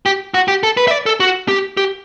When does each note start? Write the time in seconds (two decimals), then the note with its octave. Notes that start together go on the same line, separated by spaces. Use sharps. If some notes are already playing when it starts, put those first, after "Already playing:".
0.06 G4
0.34 F#4
0.48 G4
0.63 A4
0.77 B4
0.88 E5
0.91 D5
1.06 A4
1.20 F#4
1.48 G4
1.77 G4